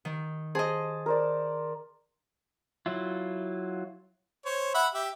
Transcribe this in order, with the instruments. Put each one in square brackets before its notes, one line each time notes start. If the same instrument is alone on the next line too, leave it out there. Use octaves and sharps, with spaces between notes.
[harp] D#3
[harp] G#4 D#5 [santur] C5 A5 D6
[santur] A#4 C5 D5
[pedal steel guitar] F#3 E4 F4
[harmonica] C5 C#5
E5 F#5 B5
G4 E5